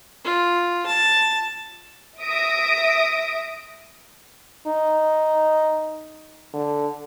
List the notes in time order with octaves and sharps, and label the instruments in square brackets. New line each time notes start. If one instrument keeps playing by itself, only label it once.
[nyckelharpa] F4
A5
[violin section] E5 D#6 A#6 D7
[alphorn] D#4
D3